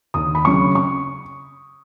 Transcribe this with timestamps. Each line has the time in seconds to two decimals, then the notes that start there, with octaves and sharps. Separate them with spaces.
0.14 D#2 D#6
0.35 B5
0.45 C#3 F#3 C#4 C#6
0.75 C#6